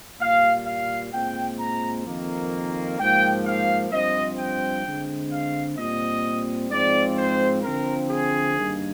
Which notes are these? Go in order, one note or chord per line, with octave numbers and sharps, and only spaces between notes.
A#2 G3 A#3 F5
F5
A#2 G#3 C4 G5
A#5
F2 D#3 A#3
G#2 F3 A#3 G5
F5
G2 F3 C4 D#5
G5
D3 G#3 C4
F5
A#2 G3 C4 D#5
G#2 F3 G#3 C4 D5
C5
D3 F3 C4 A#4
G#4
G2 D#3 A#3